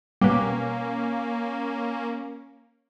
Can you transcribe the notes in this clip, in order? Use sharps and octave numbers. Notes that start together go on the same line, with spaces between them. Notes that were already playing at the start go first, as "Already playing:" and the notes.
B2 G3 A#3 C#4